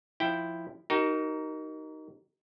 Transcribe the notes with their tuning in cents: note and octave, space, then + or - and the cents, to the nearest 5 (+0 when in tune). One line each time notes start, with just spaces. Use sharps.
F3 +0 E4 +0 G5 +0
D#4 +0 F#4 +40 A#4 +0